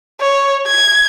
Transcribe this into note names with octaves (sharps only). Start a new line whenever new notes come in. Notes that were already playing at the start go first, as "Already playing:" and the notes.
C#5
G#6